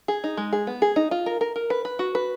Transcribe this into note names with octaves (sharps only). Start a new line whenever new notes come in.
G#4
D#4
G#3
G#4
B3
G#4
D#4
F4
A#4
A#4
A#4
B4
B4
F#4
B4